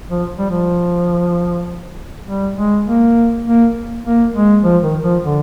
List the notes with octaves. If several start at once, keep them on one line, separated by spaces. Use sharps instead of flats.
F3
G3
F3
G3
G#3
A#3
A#3
A#3
G#3
F3
D#3
F3
D3